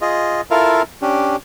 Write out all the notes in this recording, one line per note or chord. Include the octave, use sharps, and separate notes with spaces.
F4 G#4 D#5
E4 F4 A4 A#4 E5 F5
C#4 D4 G4